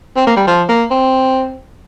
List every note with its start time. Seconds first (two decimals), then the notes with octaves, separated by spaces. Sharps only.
0.16 C4
0.27 A#3
0.36 G3
0.47 F3
0.69 A#3
0.90 C4